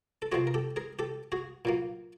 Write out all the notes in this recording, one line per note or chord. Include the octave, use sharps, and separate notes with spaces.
A4
C3 F3 G#3 C4 F#4 G#4
A#4
G4 A4
G#4 A#4
G4 A4
F#4 G#4
A#2 F#3 A#3